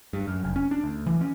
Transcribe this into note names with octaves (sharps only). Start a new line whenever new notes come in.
G2
F#2
F1
C#4
D4
D2
E3
C#4